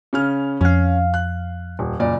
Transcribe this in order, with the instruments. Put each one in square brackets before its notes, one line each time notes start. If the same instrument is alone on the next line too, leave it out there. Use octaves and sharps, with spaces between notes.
[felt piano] C#3 C#4 F6
[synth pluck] F2 F5 [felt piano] C#4
[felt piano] F#6
D#1
F#1 A#2 D5